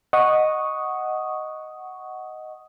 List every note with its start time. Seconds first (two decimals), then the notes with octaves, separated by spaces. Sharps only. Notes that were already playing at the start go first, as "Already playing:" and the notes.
0.13 D#5 F#5 C#6 D#6